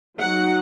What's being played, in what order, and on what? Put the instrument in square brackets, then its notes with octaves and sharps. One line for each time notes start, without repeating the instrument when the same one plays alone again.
[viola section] F#3 D#4 F#5